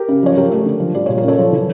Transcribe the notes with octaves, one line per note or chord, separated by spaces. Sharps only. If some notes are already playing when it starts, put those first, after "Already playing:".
Already playing: G4 A#4
C#3
F3 C#5
F3 G4 A#4
A3
D3
F3
G3 D5
A#2 C#5
A#4
C#3 A4 C#5
F3
E3